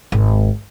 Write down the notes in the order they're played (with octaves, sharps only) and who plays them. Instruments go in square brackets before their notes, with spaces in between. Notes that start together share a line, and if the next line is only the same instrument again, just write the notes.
[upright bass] G#1